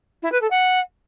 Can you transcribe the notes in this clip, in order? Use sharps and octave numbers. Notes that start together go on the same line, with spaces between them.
E4
B4
A4
F#5